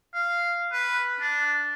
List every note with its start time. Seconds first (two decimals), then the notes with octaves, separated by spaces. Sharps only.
0.14 F5
0.73 B4
1.20 D4